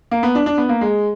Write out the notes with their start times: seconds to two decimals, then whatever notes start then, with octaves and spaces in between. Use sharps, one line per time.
0.11 A#3
0.23 B3
0.35 D4
0.46 D4
0.58 B3
0.69 A#3
0.81 G#3